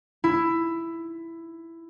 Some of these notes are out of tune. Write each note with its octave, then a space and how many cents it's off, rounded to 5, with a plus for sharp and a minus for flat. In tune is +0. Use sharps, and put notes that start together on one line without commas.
E4 +10